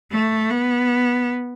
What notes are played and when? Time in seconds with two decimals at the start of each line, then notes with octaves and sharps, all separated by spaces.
0.12 A3
0.50 B3